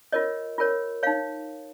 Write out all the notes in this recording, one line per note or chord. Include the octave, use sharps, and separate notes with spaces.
F4 A#4 C#5 D#5
F4 A#4 C#5
D#4 C#5 F5